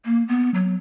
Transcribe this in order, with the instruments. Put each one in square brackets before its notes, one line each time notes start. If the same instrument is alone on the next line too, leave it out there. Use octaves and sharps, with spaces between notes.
[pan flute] A#3
B3
F#3